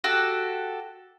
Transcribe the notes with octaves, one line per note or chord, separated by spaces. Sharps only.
F#4 G4 A4